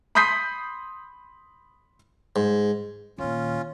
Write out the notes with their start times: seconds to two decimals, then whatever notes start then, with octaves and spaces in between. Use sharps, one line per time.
0.15 B5 C6 D#6 G6 B6 C7
2.36 G#2
3.18 D#2 A#2 C#4 F4